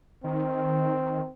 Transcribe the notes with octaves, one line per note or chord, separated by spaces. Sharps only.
D#3 C4